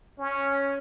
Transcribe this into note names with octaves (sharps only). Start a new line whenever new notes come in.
C#4